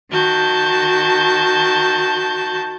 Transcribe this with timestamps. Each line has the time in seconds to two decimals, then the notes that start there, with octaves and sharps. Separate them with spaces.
0.10 D#3 F#4 A5 G6